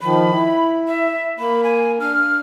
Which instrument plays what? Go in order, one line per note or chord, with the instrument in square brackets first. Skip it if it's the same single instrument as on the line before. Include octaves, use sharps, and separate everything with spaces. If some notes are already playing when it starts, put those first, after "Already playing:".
[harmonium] D#3 F3 [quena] B5
[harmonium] E4
[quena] E5
[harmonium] A#3 [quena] B5
[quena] G#5
[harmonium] D4 [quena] F6